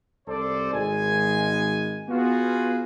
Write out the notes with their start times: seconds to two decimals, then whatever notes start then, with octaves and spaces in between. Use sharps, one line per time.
0.27 C2 A4 C5 D5
0.73 G#1 G#3 G#5
2.09 B3 F4 F#4 G#4